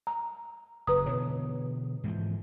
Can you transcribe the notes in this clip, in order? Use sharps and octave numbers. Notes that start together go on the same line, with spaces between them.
A#5
F#1 B4 A#5 D#6
B2 D3 E3 C#5
G#2 E3 F3